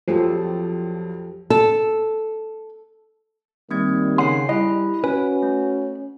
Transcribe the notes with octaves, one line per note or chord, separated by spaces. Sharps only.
A#1 F2 F3 F#3 G4 A4 C5
A4
D#3 G3 A#3 C4 G#6
C#3 C#5 F#5 G#5 C6 C7
G3 E4 D#5 B5
C#4 F#4 B4 G#5
A3